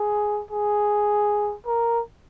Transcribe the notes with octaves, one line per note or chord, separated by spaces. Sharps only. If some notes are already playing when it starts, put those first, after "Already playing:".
Already playing: G#4
G#4
A#4